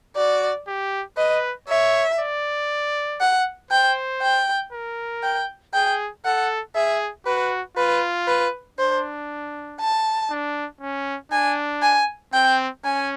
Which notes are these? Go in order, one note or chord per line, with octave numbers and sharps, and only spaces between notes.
F#4 D5
G4
B4 D#5
C#5 E5
D5
F#5
C5 G5
G5
A#4
G5
G#4 G5
A4 F#5
G#4 E5
F#4 B4
F4 B4
B4
D4 C5
A5
D4
C#4
D4 G#5
G#5
C4 G5
C#4 G#5